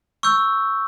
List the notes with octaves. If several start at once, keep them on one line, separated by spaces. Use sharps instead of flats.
C#6 E6 G6